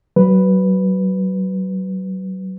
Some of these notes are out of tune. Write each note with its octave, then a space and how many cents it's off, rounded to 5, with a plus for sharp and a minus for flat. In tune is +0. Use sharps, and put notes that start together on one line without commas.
F#3 +30 B4 +0